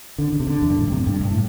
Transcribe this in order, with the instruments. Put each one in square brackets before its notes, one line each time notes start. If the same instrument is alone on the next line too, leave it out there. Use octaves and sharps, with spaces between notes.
[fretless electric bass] D3
D3
C3
D3
E2
G2
A2
G2
C3
A2
G2
G2
A2